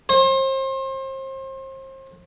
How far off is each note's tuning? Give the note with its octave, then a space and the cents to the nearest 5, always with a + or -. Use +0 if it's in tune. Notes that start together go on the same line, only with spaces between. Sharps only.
C5 +35